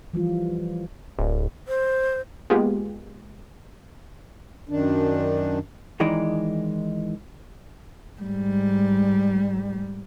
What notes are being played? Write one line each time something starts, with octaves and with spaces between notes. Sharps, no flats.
E3 F3 G3 F4
D1
C5
G#3 A#3 B3 F4 G4 G#4
F#2 D#3 D4
D#3 E3 G#3 D#4 D5
G#2 G3